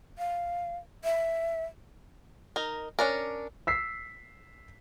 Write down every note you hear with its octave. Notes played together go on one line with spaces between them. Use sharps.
F5
E5
D#4 A#4
C#4 D4 A#4
E6 B6 C7